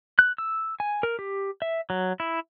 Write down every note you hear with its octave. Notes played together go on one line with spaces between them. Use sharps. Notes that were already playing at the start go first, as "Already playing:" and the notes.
F#6
E6
G#5
A#4
G4
E5
F#3
E4